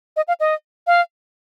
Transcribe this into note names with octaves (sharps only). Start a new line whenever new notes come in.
D#5
F5
D#5
F5